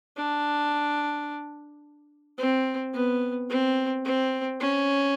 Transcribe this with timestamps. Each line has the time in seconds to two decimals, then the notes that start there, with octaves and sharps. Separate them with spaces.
0.17 D4
2.38 C4
2.94 B3
3.49 C4
4.05 C4
4.60 C#4